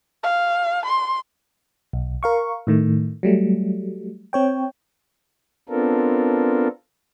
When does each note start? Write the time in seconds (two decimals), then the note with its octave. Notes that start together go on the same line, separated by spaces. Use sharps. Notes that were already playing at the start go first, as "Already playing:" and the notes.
0.23 F5
0.85 C6
1.93 B1
2.23 A#4 F5 C#6
2.67 A2 D#3 A3
3.23 F#3 G3 A3
4.33 C4 C#5 G5
5.69 B3 C4 D4 F4 A4 A#4